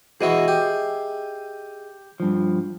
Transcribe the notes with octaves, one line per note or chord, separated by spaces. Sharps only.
B2 E3 F#4 G#4 D#5 E5
G4
G2 F3